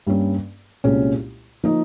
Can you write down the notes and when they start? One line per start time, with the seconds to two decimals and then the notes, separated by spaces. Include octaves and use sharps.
0.07 G2 G3 A#3 C#4
0.84 C2 A#2 G#3 C#4
1.64 F3 A#3 D#4